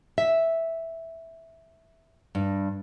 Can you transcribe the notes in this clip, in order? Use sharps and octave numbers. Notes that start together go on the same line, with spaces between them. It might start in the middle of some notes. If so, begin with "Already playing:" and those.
E5
G2